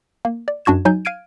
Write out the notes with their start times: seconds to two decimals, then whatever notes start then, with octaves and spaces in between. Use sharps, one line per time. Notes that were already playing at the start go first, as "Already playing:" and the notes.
0.25 A#3
0.48 D5
0.65 F#2 D4 F#4 G#6 E7
0.85 F#3 D#4 G#5 G6
1.05 F5 F6 G#6 D7 D#7